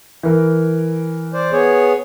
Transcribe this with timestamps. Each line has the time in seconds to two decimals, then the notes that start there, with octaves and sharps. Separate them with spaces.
0.23 E3 A#4
1.34 C5 D5
1.52 B3 G#4 C#5